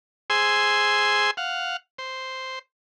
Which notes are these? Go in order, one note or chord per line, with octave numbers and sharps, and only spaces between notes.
G#4 C5 G#5 C6 E6
F5 F#5
C5